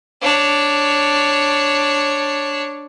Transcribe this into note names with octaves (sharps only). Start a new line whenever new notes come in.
D4 C#5